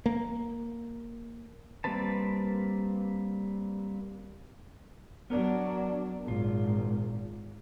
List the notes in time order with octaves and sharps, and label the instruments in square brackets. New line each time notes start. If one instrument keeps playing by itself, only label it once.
[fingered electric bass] A#3
[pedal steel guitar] G3 A#3 C4 B4 A5
[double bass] F#3 D4 [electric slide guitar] B3 A#4
[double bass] G#1 [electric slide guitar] A#2 F4